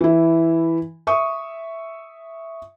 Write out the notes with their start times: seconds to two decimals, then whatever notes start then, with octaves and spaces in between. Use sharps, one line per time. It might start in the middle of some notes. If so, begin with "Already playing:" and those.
0.01 E3 E4
1.07 E5 C#6 D#6